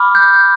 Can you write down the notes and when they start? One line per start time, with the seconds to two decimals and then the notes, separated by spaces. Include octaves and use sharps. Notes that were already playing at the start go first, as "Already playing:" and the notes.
Already playing: B5 D6 F6
0.15 G6